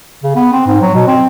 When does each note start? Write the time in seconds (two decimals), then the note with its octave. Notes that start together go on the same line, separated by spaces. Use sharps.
0.23 C#3
0.36 B3
0.52 C4
0.66 G#2
0.81 F#3
0.95 B2
1.07 C4